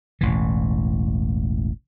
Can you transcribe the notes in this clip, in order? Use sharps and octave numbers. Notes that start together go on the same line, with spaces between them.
E1 A1 E3